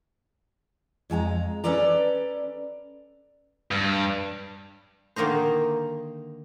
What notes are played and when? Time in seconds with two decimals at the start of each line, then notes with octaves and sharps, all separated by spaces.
1.10 F2 G#3 G#5 A#5
1.64 C#4 A4 B4 D5 A#5
3.71 G2
5.16 D3 D#3 A#3 D#4 C5